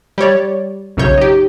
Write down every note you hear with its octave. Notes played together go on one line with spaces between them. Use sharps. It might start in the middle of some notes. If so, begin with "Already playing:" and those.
G3 G4 C#5 D5
B1 F#2 C#3 C#5 G6
D#4 G4